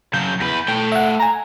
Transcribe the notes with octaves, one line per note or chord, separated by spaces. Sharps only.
C#3 F#3 G6
E2 B4
A3 G5
E5 F#5
G#5 A#5